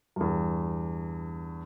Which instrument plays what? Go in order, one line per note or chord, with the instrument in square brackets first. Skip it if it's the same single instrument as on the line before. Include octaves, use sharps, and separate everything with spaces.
[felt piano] E2 G2